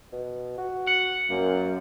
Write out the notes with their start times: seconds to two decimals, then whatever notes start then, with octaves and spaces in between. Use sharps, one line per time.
0.13 B2
0.58 F#4
0.87 F#5
1.30 F#2 A#3